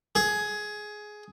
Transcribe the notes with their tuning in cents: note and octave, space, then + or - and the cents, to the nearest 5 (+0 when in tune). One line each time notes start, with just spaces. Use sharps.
G#4 +15